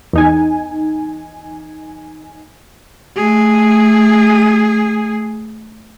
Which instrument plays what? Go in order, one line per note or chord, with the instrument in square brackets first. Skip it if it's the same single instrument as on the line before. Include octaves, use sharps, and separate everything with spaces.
[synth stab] E2 D#4 G#5
[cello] A3 G#4